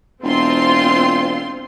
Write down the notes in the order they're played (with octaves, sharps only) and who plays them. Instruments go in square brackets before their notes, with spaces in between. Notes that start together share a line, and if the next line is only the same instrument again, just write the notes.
[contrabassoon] E1 [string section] C4 F4 C6